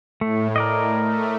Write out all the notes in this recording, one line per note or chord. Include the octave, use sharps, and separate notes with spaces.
A2 A3
A#4 D5 D#5
A3